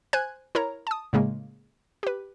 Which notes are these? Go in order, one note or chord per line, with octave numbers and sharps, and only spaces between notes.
C5 G#5 F#6 G#6
E4 A#4 C#5 A#5
A5 D#6
A2 C#3 G#3 A#3
G4 B4